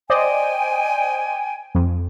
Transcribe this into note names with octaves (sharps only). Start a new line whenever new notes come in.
C5 D5 D#5 G5 G#5
F2